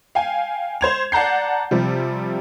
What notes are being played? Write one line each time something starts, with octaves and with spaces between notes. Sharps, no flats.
F5 G5 G#5
C5 G#6 F7
D5 F#5 A5 A#5 G6 C7
C3 F3 G3